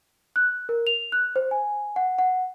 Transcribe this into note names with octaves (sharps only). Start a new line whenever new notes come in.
F#6
A#4
F7
F#6
C5
G#5
F#5
F#5